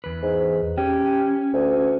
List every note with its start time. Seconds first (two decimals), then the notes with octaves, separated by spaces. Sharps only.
0.04 E2 B4
0.22 G#2
0.78 C#4 G4
1.54 D2